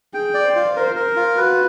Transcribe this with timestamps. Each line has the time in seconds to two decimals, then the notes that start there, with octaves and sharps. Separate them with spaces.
0.14 G#4 G5
0.34 D5
0.45 C5
0.56 F4
0.75 A#4 C5
0.96 A#4
1.16 F4
1.37 F#4 B4